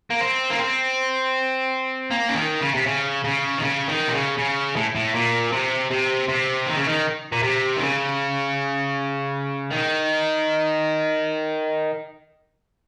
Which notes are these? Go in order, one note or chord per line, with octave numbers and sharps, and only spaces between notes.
A#3
C4
A#3
C4
A#3
C#3
D#3
C#3
C3
C#3
C#3
D#3
C#3
D#3
C3
C#3
C#3
A2
A2
A#2
C3
C3
C3
D#3
C#3
D#3
A#2
C3
D#3
C#3
D#3